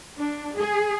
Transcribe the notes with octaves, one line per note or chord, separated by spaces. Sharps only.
D4
G#4